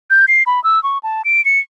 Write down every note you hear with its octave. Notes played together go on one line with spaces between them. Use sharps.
G6
C7
B5
E6
C#6
A5
D7
C#7